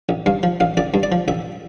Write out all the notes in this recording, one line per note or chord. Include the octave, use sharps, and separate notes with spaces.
A1
G2 F5
F3
A1 F5
A1 D5
G2
D5
F3
A1 E5